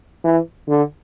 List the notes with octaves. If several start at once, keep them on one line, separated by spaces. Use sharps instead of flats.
E3
D3